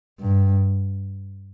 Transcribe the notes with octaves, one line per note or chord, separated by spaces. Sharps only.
G2